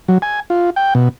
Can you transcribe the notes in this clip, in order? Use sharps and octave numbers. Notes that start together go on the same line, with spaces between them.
F#3
G#5
F4
G5
B2